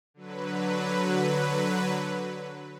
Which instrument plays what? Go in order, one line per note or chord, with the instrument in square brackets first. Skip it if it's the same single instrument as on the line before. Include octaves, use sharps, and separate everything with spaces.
[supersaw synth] D3 F#3 B4